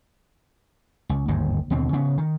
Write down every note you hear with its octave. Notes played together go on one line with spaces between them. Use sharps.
C#2
G1 D#2 G#2
D#2 B2 D3 C4
C#3 B3
D#3